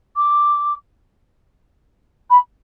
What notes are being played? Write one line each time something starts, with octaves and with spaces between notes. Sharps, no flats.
D6
B5